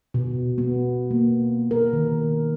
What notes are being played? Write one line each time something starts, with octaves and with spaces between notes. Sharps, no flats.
B2
B3
A#3
A#4
D#3